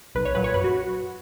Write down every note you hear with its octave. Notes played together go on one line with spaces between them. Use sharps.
B1 B4
C#5
A#2 F#3 B4
C#5
F#2 B4
F#4